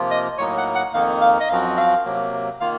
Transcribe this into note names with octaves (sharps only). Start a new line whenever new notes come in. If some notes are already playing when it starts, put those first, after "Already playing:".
Already playing: C3 F3 A#3 F4
D#5
A2 F#3 A#3 D#4 C#5
F#5
F#5
F2 D#3 A#3 D#4 F5
F5
D#5
F#2 F3 C4 F#4 F5
F5
C3 F#3 A#3
D#3 A#3 F4 F5